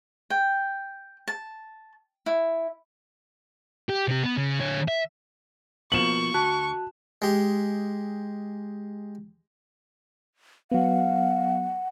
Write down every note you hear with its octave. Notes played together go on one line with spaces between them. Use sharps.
G5
A5
E4
G4
C3 G4
B3
C#3
D3 C#5
E5
B2 F3 A#3 C#6 E7 F#7
D2 F#4 A5 F#6
G#3 G4
F#3 B3 F5 F#5